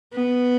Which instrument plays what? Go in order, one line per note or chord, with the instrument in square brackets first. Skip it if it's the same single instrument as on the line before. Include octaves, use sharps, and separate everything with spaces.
[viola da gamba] B3